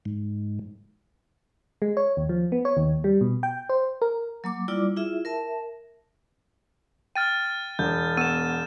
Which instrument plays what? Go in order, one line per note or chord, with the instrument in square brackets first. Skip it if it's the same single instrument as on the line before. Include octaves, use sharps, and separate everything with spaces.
[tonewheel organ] G#2
[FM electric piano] G#3
C#5
D#2
F3
B3
C#5
D#2
G3
B2
G5
C5
A#4
[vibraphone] F#3 A#3 D6
G3 E4 F4 D5 D6
E4 F4 G#4 E5
A#4 E5 A5
[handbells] G5 [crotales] F6 A6 D#7
[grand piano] E1 [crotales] G6
[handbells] B3 [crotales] D#7 E7